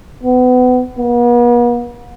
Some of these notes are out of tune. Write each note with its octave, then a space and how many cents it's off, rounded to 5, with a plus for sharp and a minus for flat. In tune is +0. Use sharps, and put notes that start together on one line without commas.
B3 +30
B3 -45